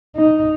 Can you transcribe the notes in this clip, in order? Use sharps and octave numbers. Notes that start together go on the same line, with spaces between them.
D#4